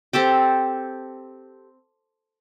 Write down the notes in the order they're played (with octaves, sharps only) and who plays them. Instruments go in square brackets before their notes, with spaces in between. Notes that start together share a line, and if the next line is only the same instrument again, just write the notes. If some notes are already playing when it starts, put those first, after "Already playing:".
[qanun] C4 G4 A4 G5